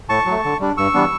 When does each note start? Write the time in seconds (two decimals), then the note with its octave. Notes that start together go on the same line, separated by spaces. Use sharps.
0.09 A2 A5 C#6
0.26 F#3
0.31 A3
0.44 D3
0.60 G3 D4
0.77 G2 C#6 E6
0.94 E3 G3 B3 D4